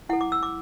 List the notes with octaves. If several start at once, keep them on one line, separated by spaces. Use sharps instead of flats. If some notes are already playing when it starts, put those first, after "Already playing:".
E4 A4 F#5
D6
E6
D6